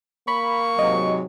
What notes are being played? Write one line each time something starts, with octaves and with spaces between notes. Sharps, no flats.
A#3 B5 C#6
G#2 C3 F#3 D#5